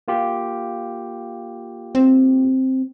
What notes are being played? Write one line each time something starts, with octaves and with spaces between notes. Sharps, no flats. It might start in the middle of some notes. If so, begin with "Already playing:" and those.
A#3 F4 G4
C4